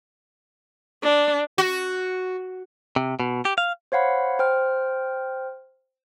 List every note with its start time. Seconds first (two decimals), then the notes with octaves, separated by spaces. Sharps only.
1.02 D4
1.58 F#4
2.96 C3
3.20 B2
3.45 G4
3.58 F5
3.92 C5 C#5 F5 F#5 B5
4.39 C5 G5 F6